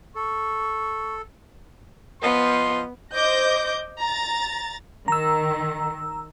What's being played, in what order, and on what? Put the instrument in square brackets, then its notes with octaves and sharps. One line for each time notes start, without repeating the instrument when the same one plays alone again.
[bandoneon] A4 [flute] C#6
[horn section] F3 D#5 C6 [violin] B3
[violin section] C5 D#5 D6 G6 A#6
A#5 A6
[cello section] D#3 [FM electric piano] A#5 E6